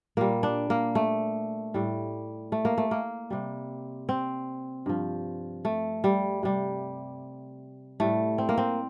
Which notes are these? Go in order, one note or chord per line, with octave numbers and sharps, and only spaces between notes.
A#2 G3 A#3
D4
A#3
A3
A2 G3
A3
A#3
A3
A#3
C3 G3
C4
G2 F3
A3
G3
C3 G3
A2 G3 A3
C4
A#3
C4